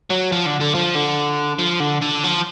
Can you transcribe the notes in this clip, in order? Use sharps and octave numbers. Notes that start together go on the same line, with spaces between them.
F#3
F3
D3
D3
F3
D3
F3
D3
D3
F3